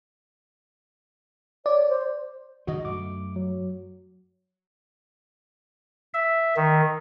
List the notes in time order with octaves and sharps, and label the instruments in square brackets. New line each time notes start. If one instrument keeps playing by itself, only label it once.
[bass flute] C#5 [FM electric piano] D5
[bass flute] C5
[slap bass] D3 F3 G#3 [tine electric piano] F#4 D#5
[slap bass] F#2 A3 [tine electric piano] D6
[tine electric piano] F#3
[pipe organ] E5
D#3